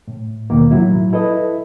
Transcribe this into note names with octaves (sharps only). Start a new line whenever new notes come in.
A2
D#2 B2 D#3 A#3
A2 F#3 E4
E4 A4 B4 D#5